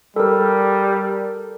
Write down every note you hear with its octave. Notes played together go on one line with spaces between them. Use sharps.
G3 A4 A#4